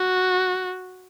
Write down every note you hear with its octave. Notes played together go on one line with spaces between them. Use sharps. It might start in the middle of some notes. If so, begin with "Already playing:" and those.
Already playing: F#4